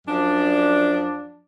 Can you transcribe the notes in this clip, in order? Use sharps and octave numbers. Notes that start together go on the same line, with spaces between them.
F#2 F3 D4